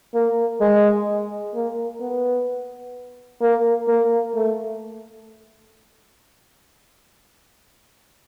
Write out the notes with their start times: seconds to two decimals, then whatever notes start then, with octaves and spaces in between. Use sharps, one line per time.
0.14 A#3
0.61 G#3
1.55 A#3
2.01 B3
3.41 A#3
3.88 A#3
4.35 A3